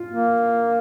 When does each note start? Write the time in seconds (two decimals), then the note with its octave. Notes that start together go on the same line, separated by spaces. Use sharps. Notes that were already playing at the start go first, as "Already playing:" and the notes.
Already playing: F4
0.10 A#3